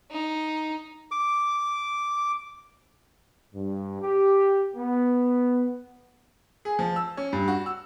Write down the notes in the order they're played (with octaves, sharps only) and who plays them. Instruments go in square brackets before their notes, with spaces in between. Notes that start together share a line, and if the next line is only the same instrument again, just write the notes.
[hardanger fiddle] D#4
[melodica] D6
[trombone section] G2
G4
B3
[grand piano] G#4
F3
E6
C#4
G2
F#4
E6